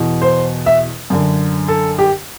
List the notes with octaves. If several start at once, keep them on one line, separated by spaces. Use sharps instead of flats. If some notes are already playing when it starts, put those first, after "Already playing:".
Already playing: E2 B2
C5
E5
F#2 D3
A4
G4